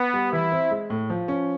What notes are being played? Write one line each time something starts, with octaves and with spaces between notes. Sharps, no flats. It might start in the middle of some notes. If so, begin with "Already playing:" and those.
Already playing: B3
G3
E3 E4
C4
G#3
A2
F3
C#4